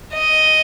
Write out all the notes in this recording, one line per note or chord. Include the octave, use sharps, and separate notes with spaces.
D#5